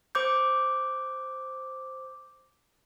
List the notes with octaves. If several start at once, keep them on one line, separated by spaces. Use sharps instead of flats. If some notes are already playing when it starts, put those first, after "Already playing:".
C5 D6 G6